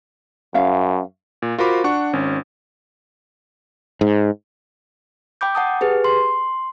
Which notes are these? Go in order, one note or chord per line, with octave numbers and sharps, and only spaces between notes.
F#2 C#4 E5 F5
A#2
F4 F#4 A#4 C5 B5 D6
D4 F#5 C#6
G#1 C#4
G#2
G5 B5 D6 G6
F#5 A5 D#6
G4 G#4 B4
C6